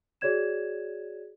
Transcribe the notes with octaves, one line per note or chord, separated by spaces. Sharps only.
F#4 G#4 C#5 D5 G#6 E7